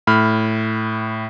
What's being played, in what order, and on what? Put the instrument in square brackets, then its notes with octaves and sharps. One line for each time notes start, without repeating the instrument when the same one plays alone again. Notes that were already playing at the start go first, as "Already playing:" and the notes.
[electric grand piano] A2 B5 F6